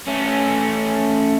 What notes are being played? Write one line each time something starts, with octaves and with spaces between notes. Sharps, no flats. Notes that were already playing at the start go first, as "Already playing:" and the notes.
A3 C#4